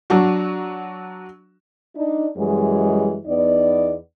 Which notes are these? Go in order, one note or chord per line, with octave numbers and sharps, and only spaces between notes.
F#3 D4 F#4
D4 D#4
F#2 E3 G3 G#3
E2 B3 D#4 D5